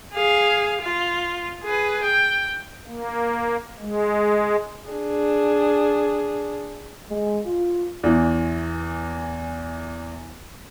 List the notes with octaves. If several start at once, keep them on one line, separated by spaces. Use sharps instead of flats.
G#4 F5
F4
G#4 B4
G5
A#3
G#3
D4 G#4
G#3
F4
E2 E3